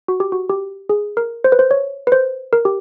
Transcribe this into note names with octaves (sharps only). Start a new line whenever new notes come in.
F#4
G4
F#4
G4
G#4
A#4
C5
B4
C5
C#5
B4
C5
A#4
G4